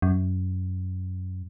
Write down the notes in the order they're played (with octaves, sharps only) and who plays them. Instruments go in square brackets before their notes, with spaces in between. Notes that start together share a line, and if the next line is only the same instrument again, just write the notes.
[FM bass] F#2